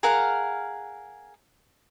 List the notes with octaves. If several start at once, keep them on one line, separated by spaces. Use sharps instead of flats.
G#4 A#4 F5 F#5